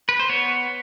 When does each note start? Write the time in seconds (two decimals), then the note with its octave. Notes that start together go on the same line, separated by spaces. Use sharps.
0.09 B4
0.20 C5
0.29 B3 C#5